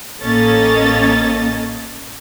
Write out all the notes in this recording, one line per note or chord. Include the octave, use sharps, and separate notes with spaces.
A1 A#3 C#4 A4 D#5 A6